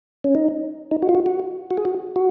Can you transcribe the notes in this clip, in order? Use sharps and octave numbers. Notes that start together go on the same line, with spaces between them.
C#4
D#4
D#4
F#4
F4
F#4
F#4
F#4
G#4
F#4
F#4